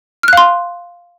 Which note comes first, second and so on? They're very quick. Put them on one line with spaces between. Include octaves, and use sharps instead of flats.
F6 F#6 F5 C6